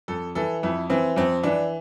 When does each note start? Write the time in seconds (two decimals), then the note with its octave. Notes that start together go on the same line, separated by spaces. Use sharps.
0.08 F2 A4
0.35 E3 A4
0.63 F2 E4
0.90 E3 C4
1.16 F2 C4
1.43 E3 D4